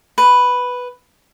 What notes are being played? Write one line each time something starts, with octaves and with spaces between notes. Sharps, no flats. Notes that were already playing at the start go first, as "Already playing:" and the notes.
B4